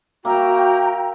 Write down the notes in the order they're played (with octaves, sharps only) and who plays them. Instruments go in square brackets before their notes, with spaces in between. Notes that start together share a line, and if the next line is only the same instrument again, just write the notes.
[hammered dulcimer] A#3 E5 [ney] F#4 [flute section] G5 A#5